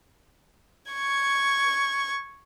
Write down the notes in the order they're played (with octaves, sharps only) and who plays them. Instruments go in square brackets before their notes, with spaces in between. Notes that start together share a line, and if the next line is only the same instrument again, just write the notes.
[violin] C#6 G#6